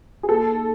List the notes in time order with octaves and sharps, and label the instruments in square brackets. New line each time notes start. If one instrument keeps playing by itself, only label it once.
[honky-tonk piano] G#4
[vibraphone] A#3 [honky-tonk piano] A4
[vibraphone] D#4 G#4